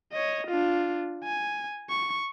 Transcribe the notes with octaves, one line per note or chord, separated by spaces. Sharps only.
C#5 D#5
D4 F4
G#5
C#6